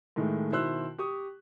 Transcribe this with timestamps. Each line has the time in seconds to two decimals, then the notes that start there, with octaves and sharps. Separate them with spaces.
0.16 A2 D#3 G#3 A3
0.51 B2 D#3 E4 C5 E6 F#6
0.98 G4 C#6 D#6